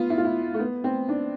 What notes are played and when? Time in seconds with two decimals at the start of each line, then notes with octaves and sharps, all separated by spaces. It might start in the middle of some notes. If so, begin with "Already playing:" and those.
Already playing: B3 F4
0.10 E4
0.18 F4
0.25 E4
0.54 A3
0.59 B3
0.84 C4
1.09 D4